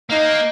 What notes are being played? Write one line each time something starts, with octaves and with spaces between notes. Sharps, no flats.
A#3 D#4